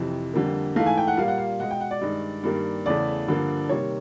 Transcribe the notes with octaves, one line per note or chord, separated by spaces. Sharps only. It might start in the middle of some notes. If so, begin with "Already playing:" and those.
Already playing: F2 C3 E3
F2 D3 G3 A#3
G#2 E3 A3 F5
G#5
G5
F#5
A#2 G3 A#3 F5
F#5
F5
B2 G#3 F#5
G5
F#5
D5
G2 D#3 G#3
G2 D#3 G3 A#3
E2 C#3 E3 A3 D5
G2 D3 F3 A#3
C3 D#3 G3 A#3 C#5